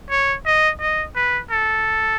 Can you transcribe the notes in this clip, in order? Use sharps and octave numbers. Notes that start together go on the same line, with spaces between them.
C#5
D#5
D#5
B4
A4